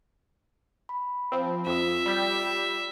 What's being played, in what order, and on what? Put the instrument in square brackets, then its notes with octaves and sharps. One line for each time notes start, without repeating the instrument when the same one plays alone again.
[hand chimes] B5
[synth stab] F3 C4
[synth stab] F2 [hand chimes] F4 D#6 [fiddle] E5
[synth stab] G3 G4